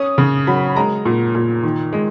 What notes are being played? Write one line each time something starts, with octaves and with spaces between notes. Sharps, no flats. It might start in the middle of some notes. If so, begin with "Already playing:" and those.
Already playing: C#4 D#6
C#3
F#3 B5
G#3 A#5
A#2
A#2
D#3
G#3